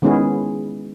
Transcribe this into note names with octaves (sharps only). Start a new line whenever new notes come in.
D#3 G#3 B3 C#4 E4 G#4